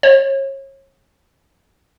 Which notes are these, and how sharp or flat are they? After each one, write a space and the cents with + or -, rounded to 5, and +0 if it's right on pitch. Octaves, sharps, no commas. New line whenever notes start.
C#5 -35